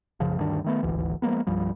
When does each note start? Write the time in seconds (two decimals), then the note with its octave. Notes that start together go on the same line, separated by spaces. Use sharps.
0.20 B1 F#2 C#3 F3
0.39 D2 G2 D#3 D4
0.64 D#3 A3 B3
0.83 D#1 G#1 D2 E3
1.22 F3 G#3 A#3 B3
1.47 C2 G2 F3 G3